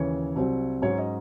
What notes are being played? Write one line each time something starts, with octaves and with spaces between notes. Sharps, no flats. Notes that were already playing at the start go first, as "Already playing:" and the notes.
Already playing: D#2 C#3 E3 C#5
C2 C3 F#3 C4
G#2 F#3 C#4 C#5
D#5